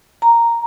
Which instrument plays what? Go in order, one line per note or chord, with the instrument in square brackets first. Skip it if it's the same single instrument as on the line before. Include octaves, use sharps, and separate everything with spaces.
[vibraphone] A#5